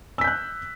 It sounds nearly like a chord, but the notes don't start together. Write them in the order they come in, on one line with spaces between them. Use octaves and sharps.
E6 B6 G6 F#6